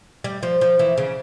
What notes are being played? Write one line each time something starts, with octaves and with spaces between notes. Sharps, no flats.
G3
F3
F3
E3
C#3